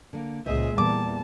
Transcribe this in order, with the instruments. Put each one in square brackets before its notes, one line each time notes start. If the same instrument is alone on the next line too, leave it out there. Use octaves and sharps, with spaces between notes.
[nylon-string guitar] D3 A#3
[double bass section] C#2 A#2 G#3 [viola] G#4 E5 [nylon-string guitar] C5 D#5
[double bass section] E2 E3 [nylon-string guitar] A#2 G3 [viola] A5 [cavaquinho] D6